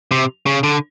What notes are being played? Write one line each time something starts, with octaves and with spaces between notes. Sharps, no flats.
C3
C#3
D3